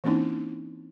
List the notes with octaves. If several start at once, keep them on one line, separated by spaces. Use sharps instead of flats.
E3 A#3 C4 C#4 D#4 E4